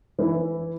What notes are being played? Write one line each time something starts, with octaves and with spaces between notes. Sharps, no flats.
E3 E4